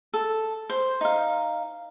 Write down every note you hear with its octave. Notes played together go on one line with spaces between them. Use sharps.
A4
C5
D#4 F5